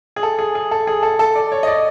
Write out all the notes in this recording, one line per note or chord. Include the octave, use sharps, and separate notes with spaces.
G#4
A4
G#4
G#4
A4
G#4
A4
A4
D5
C#5
D#5
D5